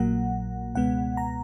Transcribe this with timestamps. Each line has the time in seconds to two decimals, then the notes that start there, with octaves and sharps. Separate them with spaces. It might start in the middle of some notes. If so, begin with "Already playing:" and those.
Already playing: A#1 A#2 F#3 A#3 F#5
0.75 C#2 B2 G#3 B3 F#5
1.17 A#5